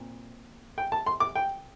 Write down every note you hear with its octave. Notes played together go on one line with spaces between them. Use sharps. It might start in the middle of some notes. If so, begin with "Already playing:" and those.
Already playing: A#2 C4
G5
A5
C6
D6
G5